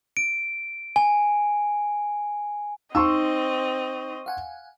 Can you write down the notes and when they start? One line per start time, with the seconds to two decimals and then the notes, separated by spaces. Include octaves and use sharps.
0.17 D7
0.96 G#5
2.95 C4 D#4 D#5 C6 C#6 E6
4.26 F5 F#5 G#5